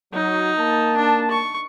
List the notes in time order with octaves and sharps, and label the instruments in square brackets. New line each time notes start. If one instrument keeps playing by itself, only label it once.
[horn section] F#3 [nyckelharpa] D#4
[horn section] A#3 A5
[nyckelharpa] D4
C#6